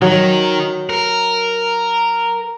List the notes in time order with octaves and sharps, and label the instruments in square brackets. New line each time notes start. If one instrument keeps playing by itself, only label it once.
[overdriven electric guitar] D#3 [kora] F#3
[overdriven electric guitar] A#4